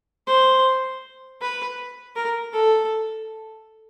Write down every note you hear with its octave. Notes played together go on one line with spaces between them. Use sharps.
C5
B4
A#4
A4